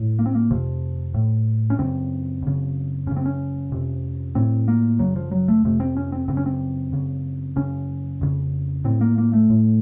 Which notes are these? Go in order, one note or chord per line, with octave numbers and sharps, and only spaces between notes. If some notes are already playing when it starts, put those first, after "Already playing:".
Already playing: A2
A#3
C4
A#3
F2 C3 F3
A2
C#4
F#2 C#3 C4
F#2 C#3
F#2 C#3 C#4
C4
C#4
F2 C3
A2 C4
A#3
F#2 C#3 F#3
F3
F#3
A3
F2 C3 A3
C4
C#4
C4
F#2 C#3 C4
C#4
C4
F#2 C#3
F#2 C#3 C#4
F2 C#3
A2 C4
A#3
A#3
A3
A2